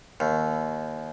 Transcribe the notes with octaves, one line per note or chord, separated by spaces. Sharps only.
D#2